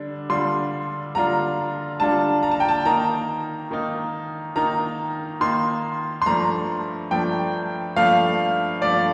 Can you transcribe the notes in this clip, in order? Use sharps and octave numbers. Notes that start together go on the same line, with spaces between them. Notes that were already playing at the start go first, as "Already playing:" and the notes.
Already playing: D3 G3 D4
D3 G3 D4 F4 C6
D3 G3 D4 F4 A#5
D3 G3 D4 F4 A5
A#5
A5
G5
A5
D#3 A#3 D#4 A#5
D#3 A#3 D#4
D#3 A#3 D#4 A#5
D#3 A#3 D#4 C6
C6
G2 F3 A3 D4 A#5
G2 F3 A3 D4 G5
G2 F3 A3 D4 F5
G2 F3 A3 D4 D5